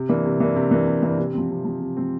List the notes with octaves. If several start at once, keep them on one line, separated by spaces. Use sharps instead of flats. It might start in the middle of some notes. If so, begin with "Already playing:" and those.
Already playing: C3
E3 A#3 D4
C3
E3 A#3 D4
C3
E3 A#3 D4
C3
E3 A#3 D4
C3
F3 C4
C3
F3 C4
C3
F3 C4